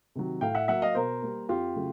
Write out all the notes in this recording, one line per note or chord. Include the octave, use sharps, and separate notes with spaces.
C3 D#3 F#3
A2 F5 G5
E5 F#5
F#3 A#3 E5 F#5
D#5 F5
B2 A#4 C5
G3 A#3
F2 F4 G4
C#3 F#3 A3